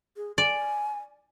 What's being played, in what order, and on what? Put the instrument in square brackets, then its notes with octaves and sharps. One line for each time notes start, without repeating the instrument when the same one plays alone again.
[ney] G#4
[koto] D5 [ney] G#5